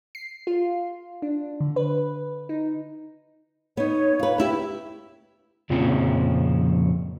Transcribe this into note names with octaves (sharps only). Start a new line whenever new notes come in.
C7
F4
D4
D3
B4
D#4
B3 D#4 C#5
F4 B4
B3 E4 G4
F2 A#2 C#3 F3 C4 C#4